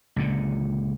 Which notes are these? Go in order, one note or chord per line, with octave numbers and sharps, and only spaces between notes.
C#2 A#2 D3